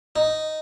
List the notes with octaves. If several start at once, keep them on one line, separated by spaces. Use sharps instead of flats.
D#4